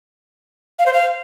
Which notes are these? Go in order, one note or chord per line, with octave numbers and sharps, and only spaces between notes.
F5
C5
F5